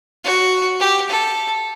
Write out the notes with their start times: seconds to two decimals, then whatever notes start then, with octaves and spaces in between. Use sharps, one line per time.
0.24 F#4
0.80 G4
1.09 A4